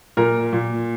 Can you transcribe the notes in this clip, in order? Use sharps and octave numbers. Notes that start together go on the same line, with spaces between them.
A#2 A#4
A#2